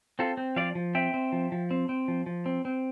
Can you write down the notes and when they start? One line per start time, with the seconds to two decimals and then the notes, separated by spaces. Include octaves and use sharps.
0.19 C4 F4 A4
0.37 C4
0.56 F3 D5 F5
0.75 F3
0.95 C4 E5 G5
1.14 C4
1.32 F3
1.52 F3
1.71 C4
1.89 C4
2.08 F3
2.26 F3
2.46 C4
2.65 C4